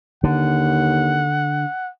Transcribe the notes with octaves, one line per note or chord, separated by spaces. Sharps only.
D#2 D3 F#5